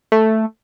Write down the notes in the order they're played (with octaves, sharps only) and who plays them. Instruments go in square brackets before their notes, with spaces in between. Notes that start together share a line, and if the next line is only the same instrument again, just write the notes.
[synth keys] A3